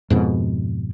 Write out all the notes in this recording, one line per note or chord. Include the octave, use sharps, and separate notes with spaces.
F2 G#2 B2